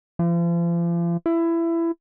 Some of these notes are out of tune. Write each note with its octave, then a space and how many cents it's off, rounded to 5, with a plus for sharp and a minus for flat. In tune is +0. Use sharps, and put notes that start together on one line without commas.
F3 -40
E4 +20